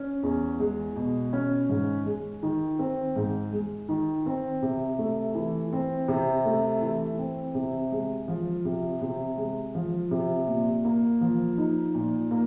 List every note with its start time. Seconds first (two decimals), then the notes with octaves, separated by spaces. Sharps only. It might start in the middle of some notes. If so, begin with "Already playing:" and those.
Already playing: C#4
0.23 E2
0.60 G#3
0.96 B2
1.33 C#4
1.70 G#2
2.06 G#3
2.43 D#3
2.79 C4
3.16 G#2
3.52 G#3
3.89 D#3
4.26 C4
4.63 C3
4.99 A3
5.35 E3
5.73 C4
6.08 C3
6.45 A3
6.82 E3
7.18 C4
7.55 C3
7.92 G#3
8.28 F3
8.65 C3
9.02 C3
9.37 G#3
9.75 F3
10.11 C3
10.48 A#2
10.85 A#3
11.21 F3
11.58 D#4
11.95 A#2
12.31 A#3